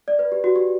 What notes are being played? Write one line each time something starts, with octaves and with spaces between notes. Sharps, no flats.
D5
B4
G4
F#4
G4